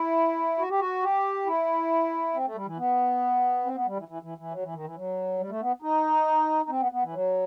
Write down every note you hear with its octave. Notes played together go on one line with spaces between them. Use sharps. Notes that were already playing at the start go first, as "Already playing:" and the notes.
Already playing: E4
F#4
G4
F#4
G4
E4
C4
A3
G3
E3
B3
C4
B3
G3
E3
E3
E3
E3
F#3
E3
D#3
E3
F#3
G3
A3
B3
D#4
D#4
C4
B3
B3
E3
F#3